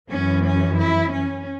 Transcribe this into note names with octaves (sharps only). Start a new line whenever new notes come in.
F#2 E3 C#4
C#4
E4
C#4